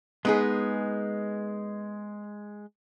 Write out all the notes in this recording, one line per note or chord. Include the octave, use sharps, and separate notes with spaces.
G#3 B3 D#4 G#4